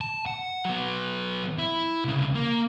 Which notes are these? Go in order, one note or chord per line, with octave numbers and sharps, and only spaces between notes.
A5
F#5
F#3 B3
E4
C2 C#3
A#3